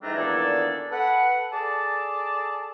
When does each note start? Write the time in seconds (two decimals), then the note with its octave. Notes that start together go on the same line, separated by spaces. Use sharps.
0.03 G#2 E3 G3 A3 D4 A#5
0.16 E2 A#2 D#3 D4 A4 G#5
0.91 A4 B4 F#5
1.53 G#4 A4 D5 A5